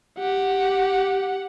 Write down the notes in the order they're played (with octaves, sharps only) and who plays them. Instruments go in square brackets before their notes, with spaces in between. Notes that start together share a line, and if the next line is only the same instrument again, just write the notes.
[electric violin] G4 F#5